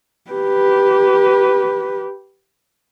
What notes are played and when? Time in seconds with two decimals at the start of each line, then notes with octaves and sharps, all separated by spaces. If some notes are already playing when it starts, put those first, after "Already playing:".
0.31 G4 B4